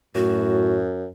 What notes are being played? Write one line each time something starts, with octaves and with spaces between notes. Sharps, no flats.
F#2 A2 F#4